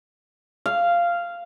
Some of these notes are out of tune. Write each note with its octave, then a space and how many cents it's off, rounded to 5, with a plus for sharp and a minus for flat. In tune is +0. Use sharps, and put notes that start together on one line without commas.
F5 -10